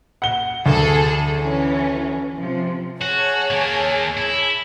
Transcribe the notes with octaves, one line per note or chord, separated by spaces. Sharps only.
F#5 G7
D2 G#4 A4
E3 C#4
C3 F3
F#4 G#4 C#5 A5
D#3 A#3
E4